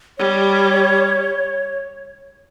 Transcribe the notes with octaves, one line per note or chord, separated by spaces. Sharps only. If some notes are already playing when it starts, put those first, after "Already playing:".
G3 C#5